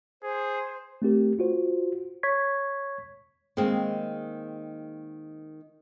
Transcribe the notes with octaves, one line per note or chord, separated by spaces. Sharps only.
G#4 C5
A3 C4 G4 A#4
F4 F#4 C5
C#5 C#6 G#6 B6
D#3 G#3 A#3 C4